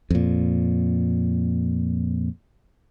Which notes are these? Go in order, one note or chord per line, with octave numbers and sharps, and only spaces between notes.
F2 A#2